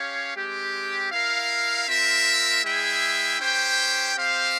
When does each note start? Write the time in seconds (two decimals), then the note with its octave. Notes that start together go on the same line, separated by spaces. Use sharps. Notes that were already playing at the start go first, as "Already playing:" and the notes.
Already playing: C#4 G4 C#5 F5
0.35 G#3 C4 G4
1.11 E4 A#4 F5
1.87 C4 F4 A#4 E5
2.63 G#3 E4 G#4 E5 G5
3.39 C#4 G4 C5 G5
4.15 C4 G4 C5 F5